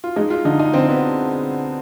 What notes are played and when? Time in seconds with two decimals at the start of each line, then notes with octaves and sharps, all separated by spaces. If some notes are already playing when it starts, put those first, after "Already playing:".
0.04 F4
0.16 G#3 D#4
0.30 F4
0.45 D3 D#4
0.59 D#4
0.74 D3 C4
0.89 B3